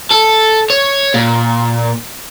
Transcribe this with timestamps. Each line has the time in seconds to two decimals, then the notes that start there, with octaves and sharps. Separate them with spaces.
0.11 A4
0.70 C#5
1.14 A#2